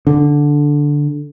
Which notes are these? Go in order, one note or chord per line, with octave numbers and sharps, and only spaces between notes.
D3